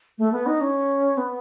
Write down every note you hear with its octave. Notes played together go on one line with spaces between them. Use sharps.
A3
B3
D#4
C#4
B3